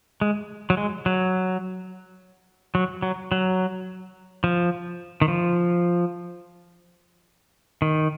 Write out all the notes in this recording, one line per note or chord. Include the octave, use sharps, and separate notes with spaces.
G#3
F#3
G#3
F#3
F#3
F#3
F#3
F3
D#3
F3
D#3